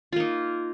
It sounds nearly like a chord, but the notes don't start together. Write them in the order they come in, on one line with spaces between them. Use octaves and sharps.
F4 A#3 D#4